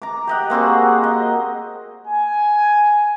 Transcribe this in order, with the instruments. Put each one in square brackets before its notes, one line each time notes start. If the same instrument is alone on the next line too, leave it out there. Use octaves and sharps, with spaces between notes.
[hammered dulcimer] A#5 D6
G4 D#5 F#5
A#3 C4 F#4 G#4
D#5
[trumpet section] G#5